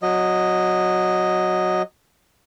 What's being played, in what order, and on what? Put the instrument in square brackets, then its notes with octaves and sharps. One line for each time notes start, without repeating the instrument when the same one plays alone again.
[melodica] F#3 D#5